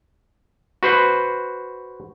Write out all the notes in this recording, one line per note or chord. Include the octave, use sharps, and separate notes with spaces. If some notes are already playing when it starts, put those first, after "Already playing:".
F#4 B4 C5